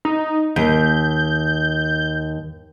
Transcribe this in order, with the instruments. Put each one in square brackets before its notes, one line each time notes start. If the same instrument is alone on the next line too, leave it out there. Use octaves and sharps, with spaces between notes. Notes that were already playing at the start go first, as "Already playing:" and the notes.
[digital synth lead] D#4
[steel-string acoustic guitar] D#2 [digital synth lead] G6